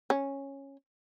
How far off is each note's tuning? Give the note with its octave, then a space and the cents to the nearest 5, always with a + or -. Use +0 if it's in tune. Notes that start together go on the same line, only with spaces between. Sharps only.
C#4 -10